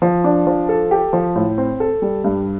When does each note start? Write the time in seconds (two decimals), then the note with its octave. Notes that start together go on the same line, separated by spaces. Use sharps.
0.02 F3
0.24 D4
0.47 F3
0.69 A4
0.91 G4
1.13 F3
1.36 A2
1.58 C4
1.80 A4
2.02 G3
2.24 G2